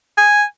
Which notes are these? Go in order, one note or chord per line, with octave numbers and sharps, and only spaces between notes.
G#5